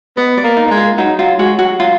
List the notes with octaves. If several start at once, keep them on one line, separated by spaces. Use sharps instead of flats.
B3 D#5
D5
A#3
D#4
A#3
G#3
F4
F#3 D#4
F#3 F4
G#3 F#4
F#3 F#4
F#3 F4